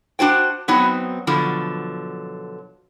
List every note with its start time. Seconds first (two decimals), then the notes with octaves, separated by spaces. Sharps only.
0.19 D4 F#4 C5 G5
0.68 F#3 B3 C4 D#4
1.27 B2 D3 F3 F#3